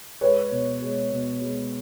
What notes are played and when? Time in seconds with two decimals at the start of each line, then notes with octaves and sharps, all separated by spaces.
0.21 G#3 B4 C#5
0.51 B2
0.82 G#3
1.12 B2
1.42 G#3